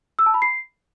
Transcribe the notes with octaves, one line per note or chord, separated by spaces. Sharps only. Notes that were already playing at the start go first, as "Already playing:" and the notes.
E6
A5
B5
C7